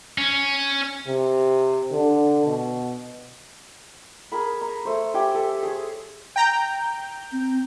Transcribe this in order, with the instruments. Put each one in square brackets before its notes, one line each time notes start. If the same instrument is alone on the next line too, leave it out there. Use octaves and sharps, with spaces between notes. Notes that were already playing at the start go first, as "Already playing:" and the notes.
[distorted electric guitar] C#4
[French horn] C3
D3
B2
[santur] G#4 A#4 B5
A#5 C#6
A3 C5
G4 E5 G5 G#5
A4
G#4 C#5
[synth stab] G5 A#5 G6
[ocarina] C4